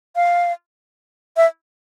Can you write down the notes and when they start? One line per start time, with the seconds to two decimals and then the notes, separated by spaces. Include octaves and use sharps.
0.16 F5
1.37 E5